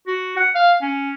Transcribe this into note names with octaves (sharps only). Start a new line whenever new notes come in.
F#4
F#5
F5
C#4